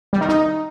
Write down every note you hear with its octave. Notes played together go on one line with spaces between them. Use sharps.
G3
D#3
D#4